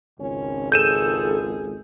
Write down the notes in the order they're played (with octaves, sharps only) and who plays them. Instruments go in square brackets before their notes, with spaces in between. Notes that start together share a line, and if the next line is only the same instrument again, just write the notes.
[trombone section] G#1 C#2 [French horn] C#4
[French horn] G#4 [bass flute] A4 [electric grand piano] G6 D#7 E7